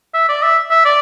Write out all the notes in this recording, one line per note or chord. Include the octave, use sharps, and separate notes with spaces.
E5
D5
E5
E5
D5